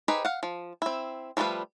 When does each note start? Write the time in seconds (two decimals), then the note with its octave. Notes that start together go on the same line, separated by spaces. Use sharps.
0.08 D#4 G4 G#4 B4 C5
0.25 F5 F#5
0.43 F3
0.82 C4 E4
1.37 F3 G3 A3 F4 B4